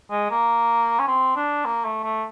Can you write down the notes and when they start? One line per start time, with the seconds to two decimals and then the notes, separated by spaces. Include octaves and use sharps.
0.11 G#3
0.30 A#3
0.99 C#4
1.07 C4
1.36 D4
1.65 A#3
1.85 A3
2.04 A3